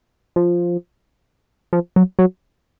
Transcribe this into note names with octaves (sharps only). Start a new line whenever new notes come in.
F3
F3
F#3
F#3